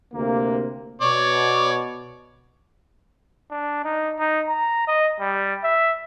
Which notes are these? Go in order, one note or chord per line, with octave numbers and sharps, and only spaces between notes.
D2 C3 A#3
B2 C#5 D5
D4
D#4
D#4
A#5
D#5
G3
E5